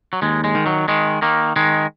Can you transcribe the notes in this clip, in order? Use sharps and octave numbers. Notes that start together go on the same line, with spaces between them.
F#3
D#2 G#3
G#3
D#3
F#3
D#3 G#3
D#3 A#3
D#3 G#3